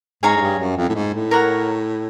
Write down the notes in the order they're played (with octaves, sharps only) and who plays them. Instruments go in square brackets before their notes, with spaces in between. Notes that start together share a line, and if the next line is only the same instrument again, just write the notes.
[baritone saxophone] G#2 [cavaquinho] G#4 C#5 F5 A#5
[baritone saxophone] G#2
G2
F#2
F2
A2
G#2
A2
[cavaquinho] A#4 C#5 F#5 A#5